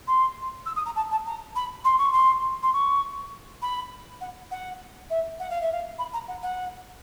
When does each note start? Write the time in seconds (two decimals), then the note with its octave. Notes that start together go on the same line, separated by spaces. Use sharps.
0.07 C6
0.66 E6
0.76 D#6
0.86 A#5
0.96 A5
1.11 A5
1.26 A#5
1.56 B5
1.85 C6
1.98 C#6
2.12 C6
2.63 C6
2.73 C#6
3.62 B5
4.21 F#5
4.51 F#5
5.10 E5
5.39 F#5
5.50 F5
5.61 E5
5.72 F5
5.99 B5
6.14 A#5
6.28 F#5
6.43 F#5